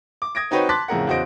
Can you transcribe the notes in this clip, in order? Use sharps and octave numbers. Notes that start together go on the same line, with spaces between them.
D6
D#6 G#6 A#6 D7
C4 D#4 F#4 B4 C#5 G5
A5 C6 D6 F#6 A6 B6
F2 A2 C#3 G#4 A#4 F#5
E2 C#3 F#4 C5 D#5 D7